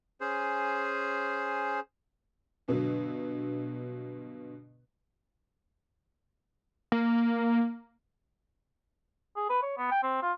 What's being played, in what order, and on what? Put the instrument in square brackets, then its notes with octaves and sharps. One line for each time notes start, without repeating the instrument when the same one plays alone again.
[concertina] C#4 G#4 C5
[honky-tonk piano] G2 B2 D3 F#3
[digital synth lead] A#3
[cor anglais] G#4
B4
C#5
B3
G5
C4
F4